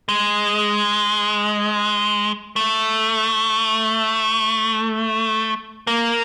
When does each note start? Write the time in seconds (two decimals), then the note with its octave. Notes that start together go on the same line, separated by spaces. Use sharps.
0.09 G#3
2.56 A3
5.87 A#3